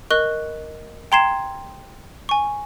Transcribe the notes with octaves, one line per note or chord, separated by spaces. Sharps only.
A#4 D#5 C#6 F#6 G7
G5 A#5 C6 G#6 C7 E7
G#5 C#6